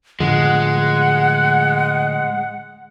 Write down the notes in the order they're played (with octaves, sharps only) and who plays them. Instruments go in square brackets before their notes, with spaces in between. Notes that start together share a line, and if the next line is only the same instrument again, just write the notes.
[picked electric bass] A2 D3 F3 [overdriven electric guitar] G#3 [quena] F#5